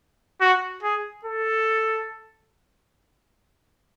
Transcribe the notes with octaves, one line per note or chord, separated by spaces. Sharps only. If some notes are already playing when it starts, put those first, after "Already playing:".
F#4
G#4
A4